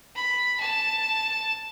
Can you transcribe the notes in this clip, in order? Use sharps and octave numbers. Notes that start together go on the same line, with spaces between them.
B5
A5